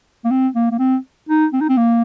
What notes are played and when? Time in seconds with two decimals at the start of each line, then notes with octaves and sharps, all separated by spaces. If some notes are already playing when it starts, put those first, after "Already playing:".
0.25 A#3
0.31 C4
0.55 A#3
0.72 A#3
0.79 C4
1.29 D#4
1.53 C4
1.61 D#4
1.69 C4
1.77 A#3